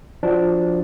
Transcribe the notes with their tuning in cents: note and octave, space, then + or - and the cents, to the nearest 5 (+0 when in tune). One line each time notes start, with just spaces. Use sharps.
F3 +5 D4 +0 F#4 +0